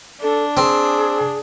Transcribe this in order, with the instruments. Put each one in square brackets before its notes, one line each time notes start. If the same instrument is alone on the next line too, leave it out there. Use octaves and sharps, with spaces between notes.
[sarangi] D4 [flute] A4
[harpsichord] C4 [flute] G#4